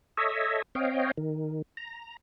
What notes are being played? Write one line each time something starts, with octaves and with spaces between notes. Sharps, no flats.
A4 C#5 D#5 E5
C4 C#5 D#5 F5 G5
D#3
A#5